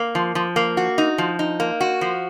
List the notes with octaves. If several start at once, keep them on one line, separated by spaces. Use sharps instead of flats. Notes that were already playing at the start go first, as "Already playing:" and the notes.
Already playing: A#3
F3
F3
A#3
F#4
D#4
F3
D#4
A#3
F#4
F3